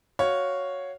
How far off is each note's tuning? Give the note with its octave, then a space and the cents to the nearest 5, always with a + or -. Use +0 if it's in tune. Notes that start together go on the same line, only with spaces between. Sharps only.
F#4 +0 C#5 +0 F5 +0